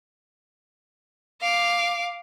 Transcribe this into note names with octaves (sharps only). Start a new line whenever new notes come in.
F5 D6